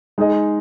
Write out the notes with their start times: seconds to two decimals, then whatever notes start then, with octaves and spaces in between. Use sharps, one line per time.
0.18 G#3 D#4 G#4 D#5